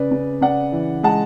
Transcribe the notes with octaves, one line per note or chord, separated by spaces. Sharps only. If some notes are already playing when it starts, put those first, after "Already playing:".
Already playing: C#3 B4 D5
C#3
C#3 D5 F#5
E3
G#3 F#5 A5